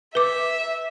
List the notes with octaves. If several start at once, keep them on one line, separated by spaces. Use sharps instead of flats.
B4 E5 D6